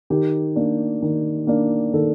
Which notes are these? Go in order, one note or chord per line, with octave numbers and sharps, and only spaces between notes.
D#3 G4
A#3 D4
D#3
A#3 D4
D#3 A4